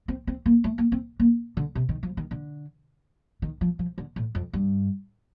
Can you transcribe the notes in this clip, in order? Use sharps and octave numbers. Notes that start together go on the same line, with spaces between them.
C4
C4
A#3
A3
A#3
C4
A#3
D3
C3
D#3
F3
D#3
D3
D#3
F3
F3
D3
A2
F2
G2